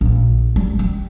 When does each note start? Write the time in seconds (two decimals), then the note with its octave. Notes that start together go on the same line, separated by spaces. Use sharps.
0.01 A#1
0.56 G3
0.79 G3